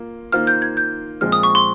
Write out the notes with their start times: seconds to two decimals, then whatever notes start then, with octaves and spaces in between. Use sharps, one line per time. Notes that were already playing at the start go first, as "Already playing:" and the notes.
Already playing: A#3 F4
0.32 D#3 A#3 F4 C5 F6
0.47 G6
0.62 G#6
0.77 G6
1.21 A#2 F3 G#3 C4 F4 F6
1.32 D#6
1.43 C#6
1.55 C6